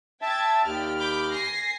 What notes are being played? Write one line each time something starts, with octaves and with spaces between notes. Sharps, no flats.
E5 G5 A5 G#6 A6
D#2 G4 D5 G5 F6
B5 D6 G6
G#5 A#6 C7